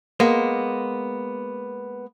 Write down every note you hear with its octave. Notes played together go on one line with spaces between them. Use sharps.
G#3 A#3 B3